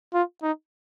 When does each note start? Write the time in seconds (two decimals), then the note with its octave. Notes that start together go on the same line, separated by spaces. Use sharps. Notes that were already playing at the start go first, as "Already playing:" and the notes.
0.14 F4
0.42 D#4